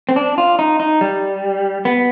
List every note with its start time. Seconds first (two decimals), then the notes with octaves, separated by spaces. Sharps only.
0.09 C4
0.16 D4
0.38 F4
0.59 D#4
0.80 D#4
1.01 G3
1.85 B3